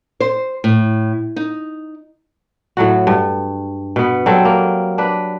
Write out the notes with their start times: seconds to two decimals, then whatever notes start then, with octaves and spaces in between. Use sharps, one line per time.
0.20 C5
0.64 A2
1.36 D#4
2.77 A2 F#3 F#4
3.07 G2
3.96 B2 B3
4.26 F#3 G3 C4 A4
4.45 A#3
4.98 D4 B4